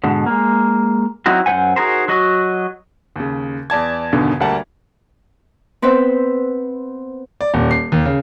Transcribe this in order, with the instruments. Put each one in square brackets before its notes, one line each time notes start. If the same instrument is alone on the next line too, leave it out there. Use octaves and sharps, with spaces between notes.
[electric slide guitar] G#2 B2 D3
G#3 A#3
F#3 C4 D#4 E4 F#4
F#2 A3 C5 F#5 G#5
D#4 F#4 G#4 A#4 C5
F#3 F#4 D#5
[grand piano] D#2 C#3
E2 D5 A5 G#6
E2 G2 B2 D3 D#3
D2 G3 A#3 F#5 A5
[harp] B3 C4 B4 C5 E5
[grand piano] D5
D#1
C7
D#2
C#3